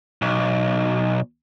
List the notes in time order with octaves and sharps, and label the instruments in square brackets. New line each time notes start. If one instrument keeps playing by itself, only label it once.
[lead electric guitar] B1